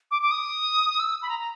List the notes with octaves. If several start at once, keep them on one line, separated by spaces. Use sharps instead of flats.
D6
D6
D#6
E6
B5
A#5
A#5